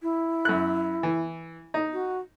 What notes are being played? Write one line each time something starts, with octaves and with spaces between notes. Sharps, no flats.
E4
F#2 F#6
E3
D#4
F#4